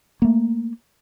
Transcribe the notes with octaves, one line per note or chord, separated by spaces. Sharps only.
A3 A#3